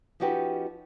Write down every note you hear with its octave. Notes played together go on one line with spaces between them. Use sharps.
F3 C#4 D#4 F#4 G4 B4